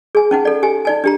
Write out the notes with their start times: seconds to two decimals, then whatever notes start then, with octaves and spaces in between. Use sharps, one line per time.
0.15 G#4 G#5
0.31 C#4 D#4 F#5
0.45 A4 D5
0.63 G4 G#5
0.85 D#4 D5 G#5
1.04 D4 G4 A#5